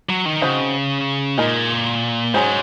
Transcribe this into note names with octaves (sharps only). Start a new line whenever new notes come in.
F#3
D#3
C#3 C4 D#4 F#4 C5 D#5
A#2 G#3 D#4 A#4
G#2 F#3 C#4 G#4 C5